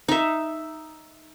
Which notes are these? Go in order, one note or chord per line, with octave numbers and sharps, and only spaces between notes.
D#4 E5